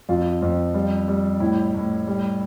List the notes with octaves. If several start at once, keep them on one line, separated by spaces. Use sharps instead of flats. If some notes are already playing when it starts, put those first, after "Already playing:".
F2 F4
F2 C4
G3
G3
A2 E4
A2
G3